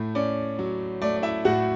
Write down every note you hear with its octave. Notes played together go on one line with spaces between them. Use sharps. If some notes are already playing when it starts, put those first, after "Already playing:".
Already playing: A2 A3
C#4 D5
F#3
A3 D5
D5
E4 E5
A2 F#4 F#5